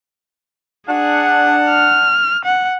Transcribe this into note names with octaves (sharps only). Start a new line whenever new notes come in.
D4 G#4 F#5
F6
F#5